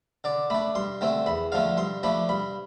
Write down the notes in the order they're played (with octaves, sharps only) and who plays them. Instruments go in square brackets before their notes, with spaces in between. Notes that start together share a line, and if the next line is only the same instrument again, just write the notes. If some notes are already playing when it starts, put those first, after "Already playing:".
[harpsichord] D3 D5
A3 D4 B5
G2 C6
D3 A3 C4
E2 B5
D3 F3 A3 F5
G2 C6
F3 A3 D4 B5
G2 B5